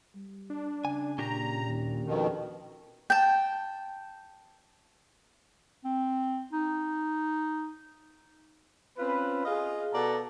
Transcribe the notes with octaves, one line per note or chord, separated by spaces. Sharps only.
G3
D4
C#3 G#5
A#2 C#4 D4 G4 A#5
D#2
F2 B2 D#3
G5 A5
C4
D#4
C4 C#4 F4 B4
F4 G#4 D#5 F5
B2 A4 D5 F#5 A5 A#5